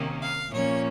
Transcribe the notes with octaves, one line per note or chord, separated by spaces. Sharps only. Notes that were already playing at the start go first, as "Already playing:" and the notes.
Already playing: C3 D#3 A#3 C#4
F5
A#2 F3 A#3 C#4 C#5